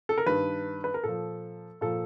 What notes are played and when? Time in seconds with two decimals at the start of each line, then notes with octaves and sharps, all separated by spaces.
0.09 A4
0.18 A#4
0.26 G2 D#3 B4
0.84 B4
0.94 A#4
1.04 A#2 F3 A4
1.81 A#2 F3 A4